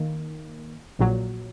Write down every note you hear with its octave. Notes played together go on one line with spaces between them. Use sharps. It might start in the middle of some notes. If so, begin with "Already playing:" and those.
Already playing: D#3 A#3
A#1 A#2 F#3